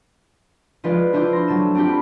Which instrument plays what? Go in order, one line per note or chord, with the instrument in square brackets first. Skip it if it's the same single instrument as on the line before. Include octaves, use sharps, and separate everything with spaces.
[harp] F3 G#3 F4 B4 D5
D4 E4 F4 C5 C6 D6
C6 A#6
F#3 A3 A4 E7
C4 D4 F4 G4
B5